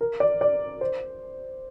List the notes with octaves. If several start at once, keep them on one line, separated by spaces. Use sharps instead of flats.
A#4
D5
D5
C5